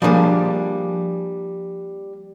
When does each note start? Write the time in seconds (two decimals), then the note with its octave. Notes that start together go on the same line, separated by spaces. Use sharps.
0.02 F3 G3 A#3 D4 G#4